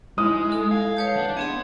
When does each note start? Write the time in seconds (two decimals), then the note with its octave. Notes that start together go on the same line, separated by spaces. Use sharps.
0.18 G#3 D#4 E4 D#6
0.52 A4
0.71 F5 G#6
0.97 B4 C#5 A5 G6
1.17 D4 F#5
1.37 B3 C4 G#4 F#5 G#6